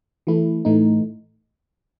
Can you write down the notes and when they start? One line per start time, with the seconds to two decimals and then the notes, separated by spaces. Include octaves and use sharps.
0.27 E3 A3 E4
0.65 A2 E3 A3 D#4